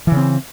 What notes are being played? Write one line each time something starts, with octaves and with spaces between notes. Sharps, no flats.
C#3 E3 C4